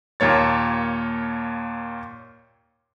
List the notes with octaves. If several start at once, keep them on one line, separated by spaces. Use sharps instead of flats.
D#2 A#2 A#3 C#5 A6